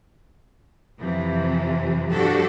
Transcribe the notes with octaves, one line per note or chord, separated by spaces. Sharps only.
F2 C3 E3 F3
G2 F3 D4 F#4 G4 A4